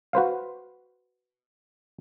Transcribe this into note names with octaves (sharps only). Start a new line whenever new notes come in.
F#4 B4 C5 F5